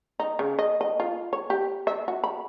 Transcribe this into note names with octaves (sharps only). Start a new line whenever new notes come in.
D#4
C#3
D#5
D#5
F4
C#5
G4
E5
F#4
B5